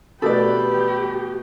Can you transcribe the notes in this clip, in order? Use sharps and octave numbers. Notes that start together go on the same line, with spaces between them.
B2 A3 G4 A4 B4 D5 B5